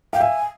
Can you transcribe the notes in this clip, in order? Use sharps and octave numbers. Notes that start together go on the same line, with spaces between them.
F5 G5
E5 G#5